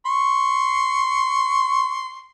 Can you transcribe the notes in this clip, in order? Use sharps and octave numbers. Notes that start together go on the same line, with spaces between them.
C6 C#6